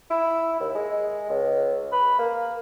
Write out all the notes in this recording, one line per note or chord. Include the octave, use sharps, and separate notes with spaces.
E4
D#2
G#3
C#2
B4
A#3